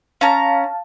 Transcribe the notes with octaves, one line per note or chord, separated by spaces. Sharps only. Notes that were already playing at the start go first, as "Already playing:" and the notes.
C#4 F5 A5 A#5